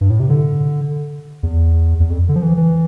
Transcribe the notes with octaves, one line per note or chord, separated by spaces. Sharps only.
G2
A2
C3
D3
E2
E2
F2
D3
F3
E3
E3